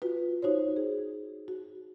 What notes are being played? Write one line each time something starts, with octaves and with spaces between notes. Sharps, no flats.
F4 F#4 B4
D#4 F#4 C5 C#5
G#4
F#4